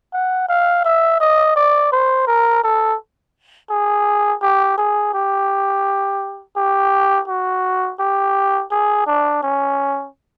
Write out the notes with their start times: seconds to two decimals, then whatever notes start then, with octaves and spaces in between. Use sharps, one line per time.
0.13 F#5
0.48 F5
0.84 E5
1.20 D#5
1.56 D5
1.92 C5
2.27 A#4
2.63 A4
3.70 G#4
4.42 G4
4.78 G#4
5.14 G4
6.57 G4
7.28 F#4
7.99 G4
8.71 G#4
9.07 D4
9.43 C#4